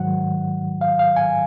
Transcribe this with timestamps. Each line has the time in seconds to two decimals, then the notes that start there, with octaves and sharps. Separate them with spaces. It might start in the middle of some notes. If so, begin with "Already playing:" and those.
Already playing: G#2 D#3 F#3 F#5
0.81 F5
0.99 F5
1.16 G#5